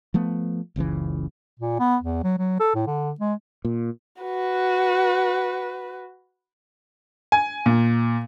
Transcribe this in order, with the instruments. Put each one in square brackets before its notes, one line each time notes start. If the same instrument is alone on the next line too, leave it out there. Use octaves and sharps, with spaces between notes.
[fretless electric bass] F3 A3 B3
F#1 C#2 C#3 E3
[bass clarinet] A#2
B3
E2
F#3
F#3
A4
A2
D3
G#3
[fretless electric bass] A#2
[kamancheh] F#4 B4
[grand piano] G#5
A#2